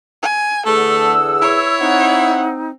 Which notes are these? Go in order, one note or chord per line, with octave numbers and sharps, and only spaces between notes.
G#5
E2 D3 A3 G#4 A4 F#5 E6
E4 C#5
C4 D#4 F#5